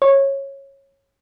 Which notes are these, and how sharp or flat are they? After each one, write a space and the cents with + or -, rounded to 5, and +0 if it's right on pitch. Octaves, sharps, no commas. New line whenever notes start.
C#5 -15